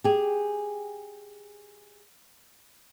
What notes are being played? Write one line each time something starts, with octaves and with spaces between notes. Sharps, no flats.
G4 G#4